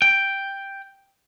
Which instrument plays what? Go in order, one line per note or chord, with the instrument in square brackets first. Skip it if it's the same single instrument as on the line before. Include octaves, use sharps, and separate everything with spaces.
[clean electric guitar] G5